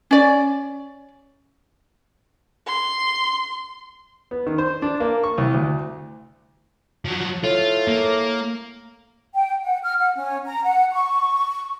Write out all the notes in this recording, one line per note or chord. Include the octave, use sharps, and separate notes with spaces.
C#4 D5
C6
B3
D#3
C5
D4
A#3
C#6
C2
D2
F3 F#3
A2 F4
A#3
G5
F#5
F6
F#5
C#4
A#5
F#5
C#6